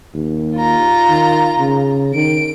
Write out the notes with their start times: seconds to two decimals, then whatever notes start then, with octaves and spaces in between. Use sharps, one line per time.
0.14 D#2
0.57 F4 A#5
1.09 D#3
1.59 C#3
2.14 D#3 D7